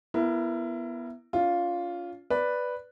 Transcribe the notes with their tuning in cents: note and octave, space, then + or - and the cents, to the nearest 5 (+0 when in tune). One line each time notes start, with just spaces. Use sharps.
B3 -10 E4 +25 A#4 -15
C#4 +40 F4 +0
B4 +0 D5 +0